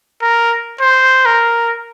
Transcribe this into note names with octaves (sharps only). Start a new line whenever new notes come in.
A#4
C5
A#4